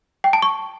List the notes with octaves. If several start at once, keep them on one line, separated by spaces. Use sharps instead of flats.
G5
A5
C#6